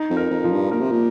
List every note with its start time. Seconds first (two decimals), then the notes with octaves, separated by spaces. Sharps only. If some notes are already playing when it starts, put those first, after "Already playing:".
Already playing: D#4
0.10 F2
0.17 A#4
0.30 F2
0.44 F3
0.52 G2
0.71 A#2 A#4
0.81 C3
0.91 A#2